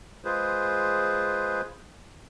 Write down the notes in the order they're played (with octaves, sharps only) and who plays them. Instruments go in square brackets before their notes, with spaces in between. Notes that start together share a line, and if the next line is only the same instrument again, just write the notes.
[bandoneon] G#3 F4 G#4 B4 C5